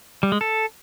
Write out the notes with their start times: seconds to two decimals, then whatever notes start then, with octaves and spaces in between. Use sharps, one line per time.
0.23 G3
0.32 G#3
0.41 A4